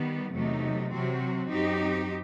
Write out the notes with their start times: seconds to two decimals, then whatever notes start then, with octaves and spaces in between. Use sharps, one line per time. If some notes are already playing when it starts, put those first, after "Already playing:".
Already playing: D#3 G3 B3
0.32 E2 C3 F#3 A3 D#4
0.92 C3 F#3 C4 F#4
1.50 F#2 F#3 C4 D#4 G4